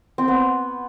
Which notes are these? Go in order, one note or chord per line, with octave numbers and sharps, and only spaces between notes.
C4
B3